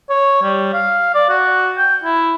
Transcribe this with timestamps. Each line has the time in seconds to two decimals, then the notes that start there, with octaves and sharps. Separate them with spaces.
0.10 C#5
0.42 G3
0.73 F5
1.14 D5
1.29 F#4
1.77 G5
2.04 E4